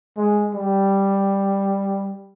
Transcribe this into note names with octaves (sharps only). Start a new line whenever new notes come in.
G#3
G3